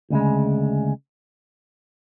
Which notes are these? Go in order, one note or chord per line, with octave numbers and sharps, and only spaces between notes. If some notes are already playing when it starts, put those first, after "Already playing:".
D2 C#3 G#3